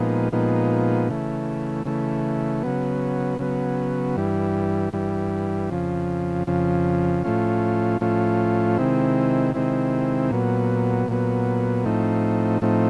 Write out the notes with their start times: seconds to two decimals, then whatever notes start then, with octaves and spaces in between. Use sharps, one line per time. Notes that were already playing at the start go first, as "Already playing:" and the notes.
Already playing: A#2 F3 G#3 B3 D#4
0.32 A#2 F3 G#3 B3 D#4
1.09 C#3 E3 A3
1.85 C#3 E3 A3
2.63 C#3 F#3 B3
3.39 C#3 F#3 B3
4.16 G2 E3 G3
4.93 G2 E3 G3
5.71 F2 C#3 F3
6.47 F2 C#3 F3
7.24 A2 F3 A3 C#4 F4
8.01 A2 F3 A3 C#4 F4
8.77 C3 D#3 G#3 C4 E4
9.54 C3 D#3 G#3 C4 E4
10.31 A#2 F#3 B3
11.08 A#2 F#3 B3
11.85 A2 F3 A3 C4 D#4
12.61 A2 F3 A3 C4 D#4